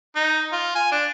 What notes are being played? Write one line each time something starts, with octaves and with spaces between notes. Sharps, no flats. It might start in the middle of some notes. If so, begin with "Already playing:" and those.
D#4
F4
G#5
D4